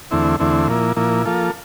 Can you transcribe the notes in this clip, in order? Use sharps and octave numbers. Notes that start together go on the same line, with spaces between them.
E2 D3 A3 C4 E4
E2 D3 A3 C4 E4
A#2 F3 A#3 E4
A#2 F3 A#3 E4
F3 A#3 F4 A4